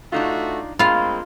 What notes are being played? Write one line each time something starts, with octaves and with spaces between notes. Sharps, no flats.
A3 D4 D#4 F4 F#4
G2 G#3 A#3 C4 F4 F5 B5